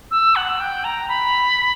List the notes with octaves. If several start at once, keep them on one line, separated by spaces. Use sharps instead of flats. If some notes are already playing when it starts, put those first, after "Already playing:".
E6
F#5
G5
A#5
B5